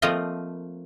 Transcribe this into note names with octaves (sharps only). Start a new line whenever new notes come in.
F3 A3 A#3 C4 F4 D#5